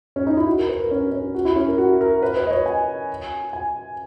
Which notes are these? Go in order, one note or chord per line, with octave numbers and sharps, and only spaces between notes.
C#4
D#4
E4
F#4
A#4
B4
A#4
C#4
C#4
F#4
E4
C#4
A#4
F#4
A#4
B4
B4
D#5
C#5
G#5
G#5